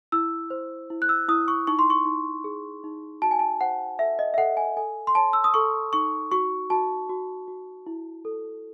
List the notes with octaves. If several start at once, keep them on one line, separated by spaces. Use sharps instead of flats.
E4 E6
C5
E4
F#6
E6
E4 D#6
C#6
D#4 C#6
C6
C#6
D#4
G#4
D#4
F#4 A5
G#5
A5
C5 F#5
A4 E5
D#5
E5
A4 F#5
G#5
A4 G#5
C6
C#5 A5
E6
D#6
A4 C#6
D#4 C#6
F#4 C#6
F#4 A5
F#4
F#4
E4
A4